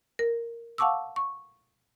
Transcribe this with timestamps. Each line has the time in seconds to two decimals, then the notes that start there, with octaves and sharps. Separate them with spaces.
0.19 A#4
0.78 F5 F#5 A5 C#6 D6 E6
1.16 C#6